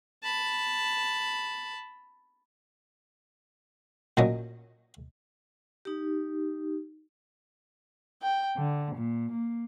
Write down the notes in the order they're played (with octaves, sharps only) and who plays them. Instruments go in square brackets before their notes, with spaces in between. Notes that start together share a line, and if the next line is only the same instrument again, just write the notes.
[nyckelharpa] A5 B5
[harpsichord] A#2 F#3 C#4 D#5
[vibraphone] D#4 G4
[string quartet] G5
D3
A#2
A#3